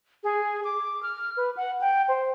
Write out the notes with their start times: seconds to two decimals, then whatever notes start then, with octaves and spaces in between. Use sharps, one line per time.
0.24 G#4
0.64 D6
1.03 F6
1.37 B4
1.57 F#5
1.81 G5
2.08 C5